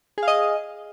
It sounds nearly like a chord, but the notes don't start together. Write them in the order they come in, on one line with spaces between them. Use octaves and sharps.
G#4 F5 D#5